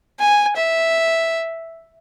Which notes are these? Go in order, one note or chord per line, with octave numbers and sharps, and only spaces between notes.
G#5
E5